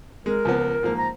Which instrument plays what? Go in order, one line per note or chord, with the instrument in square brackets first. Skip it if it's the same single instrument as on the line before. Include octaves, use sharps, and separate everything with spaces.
[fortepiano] G#3 [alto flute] A#4
[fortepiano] C#2 F3 B3
G#2 F3 A#3
[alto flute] A#5